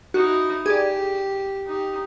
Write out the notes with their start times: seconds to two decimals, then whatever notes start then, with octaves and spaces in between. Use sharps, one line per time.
0.14 D#4 E4 F#4
0.66 G4 G#4 D5
1.66 D#4 G4